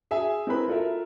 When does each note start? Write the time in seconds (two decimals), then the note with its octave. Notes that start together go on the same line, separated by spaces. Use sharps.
0.11 G#4 E5 G#5
0.47 C4 E4 A#4 B4 B5
0.68 F4 A4 A#4 E5